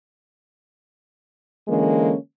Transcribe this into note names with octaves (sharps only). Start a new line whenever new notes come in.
D3 E3 G#3 A#3 C#4